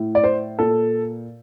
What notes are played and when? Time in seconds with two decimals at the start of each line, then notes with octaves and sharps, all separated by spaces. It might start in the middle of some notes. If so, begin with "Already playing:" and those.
Already playing: A2
0.15 D5
0.24 C5
0.59 A#2 A4